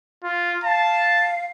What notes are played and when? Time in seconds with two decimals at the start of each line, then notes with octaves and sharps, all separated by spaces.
0.23 F4
0.64 F5 A5